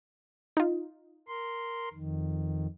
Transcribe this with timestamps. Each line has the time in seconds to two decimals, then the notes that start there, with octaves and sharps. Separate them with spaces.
0.57 D#4 F4
1.28 A#4 C6
1.93 F2 D#3